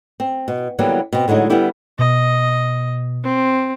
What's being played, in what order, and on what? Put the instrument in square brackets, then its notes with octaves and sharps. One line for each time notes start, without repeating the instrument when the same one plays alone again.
[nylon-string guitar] C4
B2
D3 E3 F#3 G3 A#3 B3
B2 C4
A2 D3 F#3 G#3 D#4
D3 G3 B3 E4 G4
[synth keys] B2 [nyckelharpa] D#5
[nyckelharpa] C4